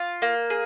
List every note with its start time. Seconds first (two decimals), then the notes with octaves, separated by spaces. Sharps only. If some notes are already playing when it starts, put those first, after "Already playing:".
Already playing: F4
0.22 A#3
0.50 G#4